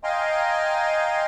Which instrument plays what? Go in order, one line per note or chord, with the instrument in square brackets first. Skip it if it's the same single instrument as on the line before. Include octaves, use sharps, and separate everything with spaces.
[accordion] D#5 F5 G5 G#5 A#5 C6